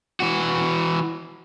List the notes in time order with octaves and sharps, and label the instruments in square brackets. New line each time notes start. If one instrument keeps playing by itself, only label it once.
[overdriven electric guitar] E3 F#4